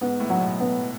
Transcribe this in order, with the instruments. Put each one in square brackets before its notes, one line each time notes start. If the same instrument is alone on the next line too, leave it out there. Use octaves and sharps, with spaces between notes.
[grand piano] G#2 [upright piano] B3
[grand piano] A2
[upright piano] F#3
[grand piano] B2
[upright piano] B3